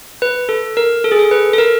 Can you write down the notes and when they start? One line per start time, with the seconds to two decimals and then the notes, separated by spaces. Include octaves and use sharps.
0.22 B4
0.49 A4
0.77 A#4
1.04 A4
1.12 G#4
1.19 A4
1.31 B4
1.53 A4
1.58 A#4